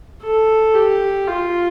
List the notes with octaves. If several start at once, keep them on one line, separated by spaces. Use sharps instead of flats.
A4
G4
F4